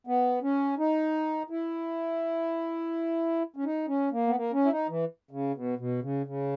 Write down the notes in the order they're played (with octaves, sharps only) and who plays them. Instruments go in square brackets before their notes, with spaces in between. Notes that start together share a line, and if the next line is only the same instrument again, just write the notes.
[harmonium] B3
C#4
D#4
E4
C#4
D#4
C#4
A#3
B3
A#3
C#4
E4
D#4
E3
C#3
B2
B2
C#3
C#3